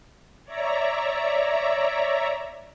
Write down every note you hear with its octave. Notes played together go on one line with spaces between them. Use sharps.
C#5 D5 E5 A#5